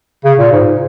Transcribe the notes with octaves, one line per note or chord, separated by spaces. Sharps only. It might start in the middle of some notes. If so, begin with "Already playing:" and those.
C#3
A#2
G#2